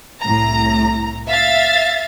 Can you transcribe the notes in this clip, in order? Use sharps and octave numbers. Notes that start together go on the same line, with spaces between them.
C2 A2 A#5
E5 F5 A6